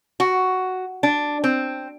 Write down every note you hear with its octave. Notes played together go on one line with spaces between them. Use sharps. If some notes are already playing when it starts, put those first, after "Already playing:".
F#4
D4
C4